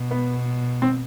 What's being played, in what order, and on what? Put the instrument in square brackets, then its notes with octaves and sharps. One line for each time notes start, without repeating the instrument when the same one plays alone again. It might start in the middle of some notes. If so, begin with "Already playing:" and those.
Already playing: [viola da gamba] B2
[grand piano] B3
C4